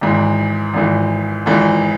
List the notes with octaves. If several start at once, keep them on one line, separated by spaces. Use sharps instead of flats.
G#1 G#2 E3
G#1 G#2 E3
G#1 G#2 E3